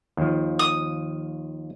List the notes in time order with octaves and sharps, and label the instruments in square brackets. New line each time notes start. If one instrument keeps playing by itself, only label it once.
[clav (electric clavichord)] D#2 F3
[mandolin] D#6